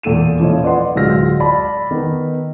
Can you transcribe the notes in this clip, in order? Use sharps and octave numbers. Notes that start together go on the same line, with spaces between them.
E2 A#2 A4 D#7 E7
F3 C#4 E4 F4 C#5 D#5
B4 D5 D#5 F#5 C6
D1 G#3 F4 E6 F6 A#6
D5 A5 B5
D#3 B3